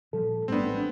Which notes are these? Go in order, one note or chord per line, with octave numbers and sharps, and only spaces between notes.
A#2 F3 G3 A4
A1 G#2 G3 A3 B3 C4 D4